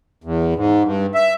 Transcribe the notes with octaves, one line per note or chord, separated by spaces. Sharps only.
E2
G#2
G2
E5